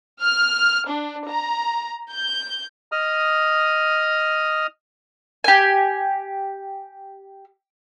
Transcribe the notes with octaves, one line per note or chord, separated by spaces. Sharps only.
F6
D4
A#5
G6
D#5 D#6 F6
G4 G#5